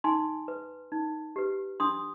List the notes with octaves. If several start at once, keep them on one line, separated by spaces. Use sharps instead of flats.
D#4 G#5 C6
B4
D#4
G4 B4
D4 C6 D#6